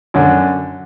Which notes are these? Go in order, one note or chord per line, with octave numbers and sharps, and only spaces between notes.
F#2 D3